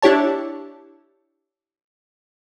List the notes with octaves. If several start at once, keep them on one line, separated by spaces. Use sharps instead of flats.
D4 E4 G4 C#5 A5